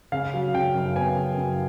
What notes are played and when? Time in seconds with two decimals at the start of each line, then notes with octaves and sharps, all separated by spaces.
0.12 C#3 F5
0.34 F#3
0.54 C#3 G5
0.74 F#2
0.96 B3 G#5
1.16 C#3
1.37 F#2